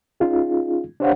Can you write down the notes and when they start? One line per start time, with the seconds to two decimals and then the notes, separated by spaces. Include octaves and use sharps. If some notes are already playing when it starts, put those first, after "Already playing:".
0.20 C#4 D#4 F4 G#4
1.00 D4 G4 C5 C#5 F5 F#5